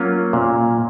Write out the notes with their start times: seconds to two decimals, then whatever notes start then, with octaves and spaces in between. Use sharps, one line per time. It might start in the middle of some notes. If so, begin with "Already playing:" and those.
Already playing: F#3 A#3 C#4 F4
0.33 A#2